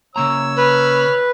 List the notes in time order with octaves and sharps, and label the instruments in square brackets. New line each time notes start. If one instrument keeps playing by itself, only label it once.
[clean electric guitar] C#3 A#3 A#5 [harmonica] C#5 E6
[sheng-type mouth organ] B4 [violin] B5 F6